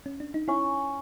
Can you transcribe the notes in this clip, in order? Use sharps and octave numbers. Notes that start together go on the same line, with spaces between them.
C#4
D4
D#4
C#4 E4